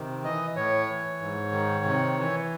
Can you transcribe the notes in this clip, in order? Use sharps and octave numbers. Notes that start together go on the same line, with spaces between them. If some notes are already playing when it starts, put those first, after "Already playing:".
Already playing: C3 D#3
E3 D#5
A2 C#5
E3
G#2
D#3
C3
E3